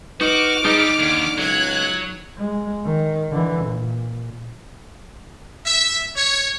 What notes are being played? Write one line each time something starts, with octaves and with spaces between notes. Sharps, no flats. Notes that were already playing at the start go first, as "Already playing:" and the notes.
D#4 F#4 B4 D6 F6
G3 D#4 G#4 A4
D#2 D3
C#2 F#3 F#6 G#6
G#3
D#3
D3 E3
A#2
E5
C#5